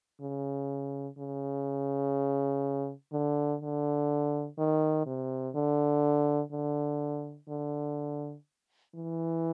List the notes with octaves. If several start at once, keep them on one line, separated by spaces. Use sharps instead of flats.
C#3
C#3
D3
D3
D#3
C3
D3
D3
D3
E3